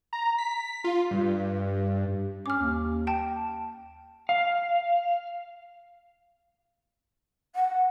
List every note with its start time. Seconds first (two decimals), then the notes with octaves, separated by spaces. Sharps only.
0.13 A#5
0.38 B6
0.84 F4
1.11 G2
2.46 C#4 D6 F6
2.60 D#2
3.07 G5 A5
4.29 F5
7.55 F#5